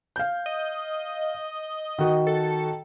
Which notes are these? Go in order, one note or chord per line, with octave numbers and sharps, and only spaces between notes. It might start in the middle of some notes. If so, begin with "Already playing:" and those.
F5 G6
D#5
D#3 F#4
A4